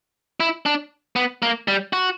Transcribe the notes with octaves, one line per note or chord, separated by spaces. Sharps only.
E4
D4
B3
A#3
G3
F#4